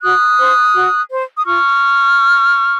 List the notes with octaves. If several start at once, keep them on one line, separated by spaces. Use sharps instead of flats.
F#4 D#6 F#6
C5
F#4
C5
D#6
F4 C#6 F6